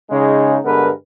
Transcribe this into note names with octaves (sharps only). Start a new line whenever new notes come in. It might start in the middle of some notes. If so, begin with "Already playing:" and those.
C#3 G#3 D#4
G2 D3 G#3 B3 A#4 B4